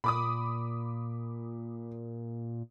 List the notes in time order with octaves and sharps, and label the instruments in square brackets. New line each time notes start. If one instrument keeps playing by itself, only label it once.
[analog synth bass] A#2 [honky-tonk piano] B5 D6 D#6